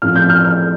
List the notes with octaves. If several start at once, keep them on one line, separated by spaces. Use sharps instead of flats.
A2 F3 C4 F6
G6
F6
F6